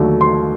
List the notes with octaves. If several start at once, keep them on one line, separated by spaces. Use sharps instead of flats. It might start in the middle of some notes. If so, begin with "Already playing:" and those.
Already playing: D#2 D3 F#3 A3 D4
C6